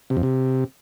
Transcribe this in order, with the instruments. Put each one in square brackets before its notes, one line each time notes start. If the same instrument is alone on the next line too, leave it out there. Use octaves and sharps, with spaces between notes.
[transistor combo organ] C3
F2
C3